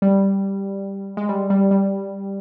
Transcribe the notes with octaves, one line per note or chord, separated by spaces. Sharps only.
G3
G#3
G3
G3
G3